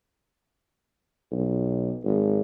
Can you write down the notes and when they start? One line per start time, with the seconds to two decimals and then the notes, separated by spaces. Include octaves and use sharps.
1.32 B1
2.04 G#1